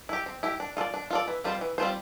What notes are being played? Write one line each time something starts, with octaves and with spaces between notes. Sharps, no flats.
E4 G4
C4
E4 G4
D4
F4 A4 D5
D4
F4 A4 D5
E3
G3 C4 F4 C5
E3
G3 C4 F4 C5